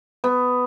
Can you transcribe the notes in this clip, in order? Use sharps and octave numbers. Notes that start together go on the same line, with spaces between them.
B3